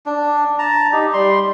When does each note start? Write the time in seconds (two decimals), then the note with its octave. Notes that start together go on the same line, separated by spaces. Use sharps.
0.06 D4
0.59 A5 A#5
0.93 D#4 G4
1.13 G3 C6